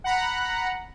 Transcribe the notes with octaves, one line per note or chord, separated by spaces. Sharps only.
F#5 A#5 B5